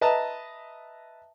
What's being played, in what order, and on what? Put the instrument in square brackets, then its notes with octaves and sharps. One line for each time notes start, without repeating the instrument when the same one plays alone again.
[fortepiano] B4 D#5 E5 A5 A#5